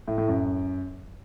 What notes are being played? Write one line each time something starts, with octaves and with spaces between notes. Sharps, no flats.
A2
A2
F#2